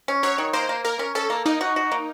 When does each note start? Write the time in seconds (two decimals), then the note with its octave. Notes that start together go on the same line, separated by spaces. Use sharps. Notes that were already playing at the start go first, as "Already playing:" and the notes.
0.08 C#4
0.23 F#3 C#5
0.38 D#3
0.53 A#3 C5
0.69 A#3
0.85 A#3 A#4
0.99 C#4
1.15 C#4 A4
1.30 A#3
1.46 A#3 D#4
1.61 F#4
1.76 F#4
1.92 A#3